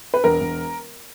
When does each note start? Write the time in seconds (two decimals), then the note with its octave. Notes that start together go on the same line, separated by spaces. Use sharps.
0.14 B4
0.24 E1 A#4
0.41 E1